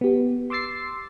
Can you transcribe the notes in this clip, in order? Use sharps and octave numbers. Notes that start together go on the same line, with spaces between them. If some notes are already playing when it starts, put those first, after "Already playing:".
B3 G4
C6 D6 E6 A6 C7